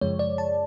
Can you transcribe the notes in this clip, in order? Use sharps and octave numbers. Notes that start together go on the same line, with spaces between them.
F#2 C#3 F3 G#3 C#5
D5
A5